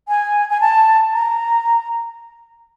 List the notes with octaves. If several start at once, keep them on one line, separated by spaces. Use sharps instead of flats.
G#5
G#5
A5
A#5